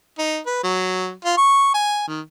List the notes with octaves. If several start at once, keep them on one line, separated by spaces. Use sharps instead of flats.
D#4
B4
F#3
F4
C#6
G#5
D#3